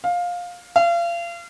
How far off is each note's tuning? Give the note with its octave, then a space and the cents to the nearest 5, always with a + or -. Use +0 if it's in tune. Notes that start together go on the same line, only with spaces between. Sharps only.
F5 +15
F5 -35